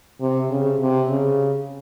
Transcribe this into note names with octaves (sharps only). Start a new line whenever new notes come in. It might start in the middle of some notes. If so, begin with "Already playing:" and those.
C3
C#3
C3
C#3